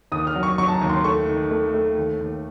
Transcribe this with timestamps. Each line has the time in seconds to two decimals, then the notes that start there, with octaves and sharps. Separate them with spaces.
0.12 D#2 D#6
0.27 F6
0.35 F#3
0.43 C#6
0.58 F#3 C#6
0.68 A5
0.73 A#5
0.81 D#2
0.89 C6
1.04 A3 C#6
1.28 D#3
1.51 A3
1.74 A3
1.97 D#2
2.21 D#2